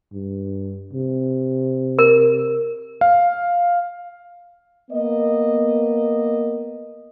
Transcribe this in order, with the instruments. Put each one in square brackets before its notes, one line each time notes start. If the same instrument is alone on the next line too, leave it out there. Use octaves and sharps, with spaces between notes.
[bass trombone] G2
C3
[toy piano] A#4
[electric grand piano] F5
[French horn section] A#3 B3 D#5